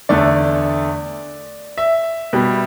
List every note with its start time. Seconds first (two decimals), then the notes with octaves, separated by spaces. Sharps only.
0.09 E2 D3 A3 D5
1.78 E5
2.33 B2 G3